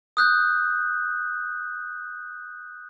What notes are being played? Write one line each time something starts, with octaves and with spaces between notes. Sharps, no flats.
D#6 F#6 G6